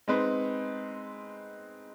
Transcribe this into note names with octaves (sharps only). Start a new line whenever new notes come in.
G#3 C4 D#4 B4